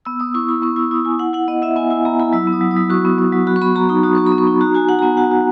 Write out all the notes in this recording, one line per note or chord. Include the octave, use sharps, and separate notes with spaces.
B3 E6
B3 D#6
E4 C#6
E4 B5
B3 C#6
E4 E6
E4 D#6
E4 G#5
E4 F#5
E4 F#5
B3 D#5
E4 E5
B3 G#5
E4 G#5
B3 A#5
E4 B5
F#3 E6
B3
D#6
F#3
D#6
F#3
F#4 C#6
B3
B3
F#3
F#4 B5
C#6
B3 B5
F#4 A#5
D#4 B5
F#4 D#6
F#4 C#6
B5
B3
C#6
D#4
F#4 A#5
F#4 G#5
F#4 F#5
A#5
B3 G#5
F#4 F#5
F#4